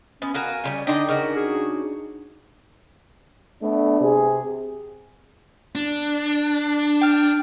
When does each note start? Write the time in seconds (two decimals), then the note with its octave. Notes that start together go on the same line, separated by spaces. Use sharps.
0.22 B3 C#4
0.34 F#4 A#4 F5 G#5
0.64 C#3 F#3 G3
0.87 D3 D4 D#4 D#5 G5
1.08 C#3 F#4 A#4
1.35 G#4
3.63 A3 B3 D4
4.01 C3 G#4
5.75 D4
7.02 G5 F6